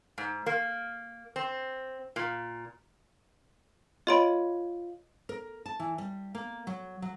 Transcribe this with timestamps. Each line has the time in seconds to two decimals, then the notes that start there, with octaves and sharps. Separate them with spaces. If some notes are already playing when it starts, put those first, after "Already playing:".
0.18 G#2
0.46 A#3
1.36 C4
2.16 A#2
4.07 F4 C#5 D#5 B5 C6 D7
5.29 A#4
5.66 A5
5.80 E3
5.98 G3
6.35 A#3
6.67 F#3
7.02 F#3